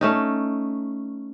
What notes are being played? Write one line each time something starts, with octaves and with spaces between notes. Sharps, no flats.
A3 C#4 D#4